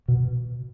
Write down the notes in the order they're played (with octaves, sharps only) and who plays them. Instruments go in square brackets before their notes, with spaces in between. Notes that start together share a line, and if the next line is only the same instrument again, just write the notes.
[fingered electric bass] B2